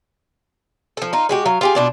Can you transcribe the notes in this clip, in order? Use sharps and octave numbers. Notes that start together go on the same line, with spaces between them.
F3 A4
D#4 F4
G#3 F#4 G4
F#3 F5
F4 G4 G#4
B2 D4 F4